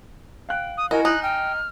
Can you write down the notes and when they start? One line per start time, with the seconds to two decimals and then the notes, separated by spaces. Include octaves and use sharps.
0.49 F5 G5 F#6
0.77 D#6
0.91 E4 F#4 A#4 D#5 G#5
1.05 D#4 F#6
1.23 G5 F6